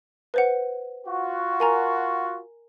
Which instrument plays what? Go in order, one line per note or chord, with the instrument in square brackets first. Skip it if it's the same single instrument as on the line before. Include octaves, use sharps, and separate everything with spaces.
[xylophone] B4 C5 F#5
[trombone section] F4 F#4
[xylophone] A#4 G#5 A#5